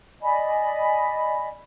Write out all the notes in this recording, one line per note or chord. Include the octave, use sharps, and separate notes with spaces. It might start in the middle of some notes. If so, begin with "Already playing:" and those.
D5 D#5 G#5 B5